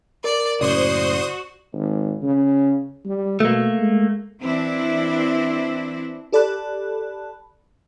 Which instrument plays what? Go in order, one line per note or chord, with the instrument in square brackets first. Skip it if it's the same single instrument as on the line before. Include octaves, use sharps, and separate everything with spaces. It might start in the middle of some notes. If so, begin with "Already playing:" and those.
[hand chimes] A#4 [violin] D5
[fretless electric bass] F#1 A2 C#3 [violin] F#4 [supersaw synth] C5 C6 D#6 [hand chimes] D5
[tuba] G#1
C#3
G3
[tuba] B2 [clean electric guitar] A3 A#3
[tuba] G#3
[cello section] E3 C4 D4 E4
[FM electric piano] G4 A4 D5 A5 B5 F#6